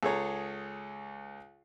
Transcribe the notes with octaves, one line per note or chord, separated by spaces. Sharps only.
C#2 G#4 A4 C#5 A#5